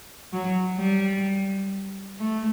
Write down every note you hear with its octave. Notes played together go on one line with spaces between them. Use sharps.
F#3
G3
A3